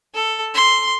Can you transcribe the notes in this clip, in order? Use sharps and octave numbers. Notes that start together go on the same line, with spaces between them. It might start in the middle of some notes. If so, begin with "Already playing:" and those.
A4
C6